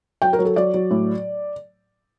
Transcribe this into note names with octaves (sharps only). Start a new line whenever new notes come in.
F#3 G5
A#4
F#3
A4
F#3 D5
F#3
A2